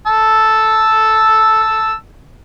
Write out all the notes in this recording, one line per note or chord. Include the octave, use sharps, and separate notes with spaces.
A5 E6